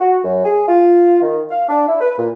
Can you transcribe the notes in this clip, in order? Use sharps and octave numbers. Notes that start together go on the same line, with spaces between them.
F#4
F#2
G#4
F4
D#3
F5
D4
E4
B4
A#2